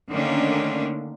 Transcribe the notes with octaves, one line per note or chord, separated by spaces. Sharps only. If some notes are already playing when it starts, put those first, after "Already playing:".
D3 D#3 A3 A#3 C#4 D4